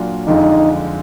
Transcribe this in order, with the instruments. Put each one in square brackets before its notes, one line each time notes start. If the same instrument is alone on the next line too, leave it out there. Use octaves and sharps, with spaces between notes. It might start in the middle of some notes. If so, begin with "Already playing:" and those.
Already playing: [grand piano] A#2 F#3 D4 F4
[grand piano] F2 D3 G#3 D4 F4 [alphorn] D#4